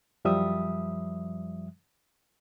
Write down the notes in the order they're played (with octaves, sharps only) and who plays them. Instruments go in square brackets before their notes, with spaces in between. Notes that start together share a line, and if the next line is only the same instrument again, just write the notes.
[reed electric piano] F#2 F3 G3 E5 D#6